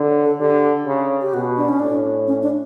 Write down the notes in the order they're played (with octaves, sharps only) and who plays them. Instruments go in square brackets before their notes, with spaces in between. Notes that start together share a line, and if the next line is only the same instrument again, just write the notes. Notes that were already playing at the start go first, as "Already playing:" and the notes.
Already playing: [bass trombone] D3
[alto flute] C#5
A4
[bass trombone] D3 [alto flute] G4
[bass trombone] C#3
[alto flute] G4
[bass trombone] B2 [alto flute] F#4
[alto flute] D4
C#4
[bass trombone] A2 [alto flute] D4
[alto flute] C#4
D4